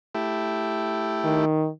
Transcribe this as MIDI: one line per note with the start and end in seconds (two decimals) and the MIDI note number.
0.15 1.45 57
0.15 1.45 64
0.15 1.45 67
1.25 1.69 51